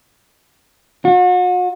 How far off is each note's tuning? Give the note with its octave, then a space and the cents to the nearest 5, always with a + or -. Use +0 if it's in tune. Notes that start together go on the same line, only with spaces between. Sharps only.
F#4 -40